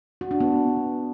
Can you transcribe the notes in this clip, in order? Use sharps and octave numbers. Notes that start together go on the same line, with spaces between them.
F#4
D4
B3